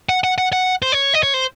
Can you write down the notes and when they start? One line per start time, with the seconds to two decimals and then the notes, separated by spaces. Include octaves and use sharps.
0.09 F#5
0.24 F#5
0.38 F#5
0.53 F#5
0.82 C5
0.92 C#5
1.14 D#5
1.23 C#5
1.34 C5